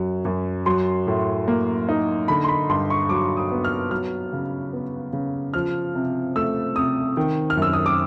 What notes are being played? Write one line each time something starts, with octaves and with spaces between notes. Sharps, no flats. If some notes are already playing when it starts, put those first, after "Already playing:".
Already playing: F#2 F#3
F#2
F#3 C6
A2
A#3
D#4
D3 B5
C6
B5
G2 C6
C#6
F#3 D6
D#6
B3
F6
F#3 F6
C#3
B3
C#3
F3 F6
C3
A3 E6
C3 D#6
D#3
F6
F#2 E6
D#6
D6